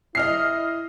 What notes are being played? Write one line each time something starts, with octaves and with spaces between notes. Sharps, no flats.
E4 D#5 F6 C7